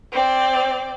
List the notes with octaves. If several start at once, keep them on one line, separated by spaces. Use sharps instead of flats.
C4 D5